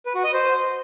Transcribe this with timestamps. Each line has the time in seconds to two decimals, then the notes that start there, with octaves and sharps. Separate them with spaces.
0.06 B4
0.15 F#4
0.24 D#5
0.33 C5